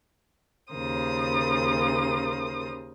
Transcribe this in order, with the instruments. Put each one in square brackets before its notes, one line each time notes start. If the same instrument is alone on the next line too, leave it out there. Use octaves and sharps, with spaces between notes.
[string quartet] D#2 C#3 A#4 C5 D#6